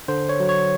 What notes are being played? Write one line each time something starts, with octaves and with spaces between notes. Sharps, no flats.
D3 C5
C#5
F#3
C#5